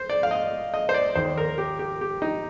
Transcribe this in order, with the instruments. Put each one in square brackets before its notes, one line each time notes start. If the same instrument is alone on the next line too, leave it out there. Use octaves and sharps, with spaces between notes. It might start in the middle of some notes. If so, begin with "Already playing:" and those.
Already playing: [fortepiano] C5
D5
F5
D#5
D#5
C5
D5
D#2 D#3 C5
A#4
G4
G4
G4
D#4